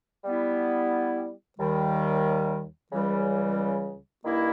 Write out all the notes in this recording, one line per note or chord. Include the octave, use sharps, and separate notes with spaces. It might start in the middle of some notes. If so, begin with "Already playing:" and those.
G3 B3 E4
D#2 D#3 G3
C#2 C#3 E3 G3
G2 D#3 A#3 E4